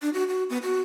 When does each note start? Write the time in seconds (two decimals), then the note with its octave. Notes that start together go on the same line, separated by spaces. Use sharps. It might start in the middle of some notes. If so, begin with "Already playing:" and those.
0.02 D4
0.14 F#4
0.28 F#4
0.50 B3
0.63 F#4